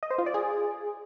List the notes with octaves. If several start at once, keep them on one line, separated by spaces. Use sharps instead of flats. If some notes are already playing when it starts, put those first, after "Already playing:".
D#5
C5
F4
D5
G#4